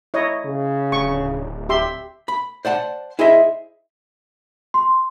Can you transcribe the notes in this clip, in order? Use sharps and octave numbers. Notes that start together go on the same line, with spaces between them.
E4 C#5 D#5
C#3
D1 C#6
G4 E5 C6
B5
C5 D5 F#5 A5
E4 G#4 C5 D#5 E5
C6